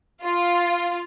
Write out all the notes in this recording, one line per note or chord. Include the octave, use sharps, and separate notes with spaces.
F4